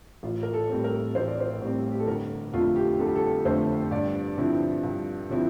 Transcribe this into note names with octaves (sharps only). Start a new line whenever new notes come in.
A1 F4
A#4
A4
A2 G3 C4
A#4
A1 C5
D5
C5
A2 G3 C4
G4
A4
G1 A#4
F2 D3 A3 F4
G4
G1 A4
G4
A4
F2 D3 A3 C5
G2 D5
D3 F3 C4 E4
G2
D3 F3 C4 E4